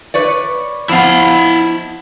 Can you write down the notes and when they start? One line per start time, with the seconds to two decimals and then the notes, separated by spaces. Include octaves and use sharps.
0.14 B4 C#5 D5
0.89 F3 B3 E4 F5